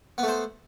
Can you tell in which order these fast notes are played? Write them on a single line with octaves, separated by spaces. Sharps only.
B3 A3 C5